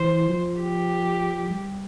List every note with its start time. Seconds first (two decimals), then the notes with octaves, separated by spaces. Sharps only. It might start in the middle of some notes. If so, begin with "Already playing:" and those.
Already playing: E3 C5
0.29 F3
0.60 G4
1.50 G3